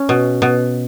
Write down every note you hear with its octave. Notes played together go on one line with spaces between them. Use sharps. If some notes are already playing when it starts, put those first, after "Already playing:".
Already playing: C#4
B2
B2